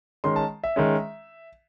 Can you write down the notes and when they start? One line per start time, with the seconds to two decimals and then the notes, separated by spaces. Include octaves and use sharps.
0.24 D#3 G#3 C#4 C6
0.36 A5
0.64 E5
0.76 D#3 G#3 C#4